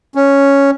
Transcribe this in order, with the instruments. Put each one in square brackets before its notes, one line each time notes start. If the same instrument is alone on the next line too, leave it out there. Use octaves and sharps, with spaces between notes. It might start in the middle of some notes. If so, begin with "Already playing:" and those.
[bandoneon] C#4